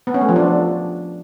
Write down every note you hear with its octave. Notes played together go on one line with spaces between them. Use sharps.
B3
C#4
A3
F3
D4